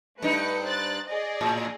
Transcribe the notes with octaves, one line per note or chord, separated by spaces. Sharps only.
G2 A3 D#4 B4 C#7
C5 F#6 A6
G#4 D5 D#5
A2